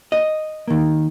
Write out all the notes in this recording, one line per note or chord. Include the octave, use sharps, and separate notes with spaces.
D#5
D#3 A#3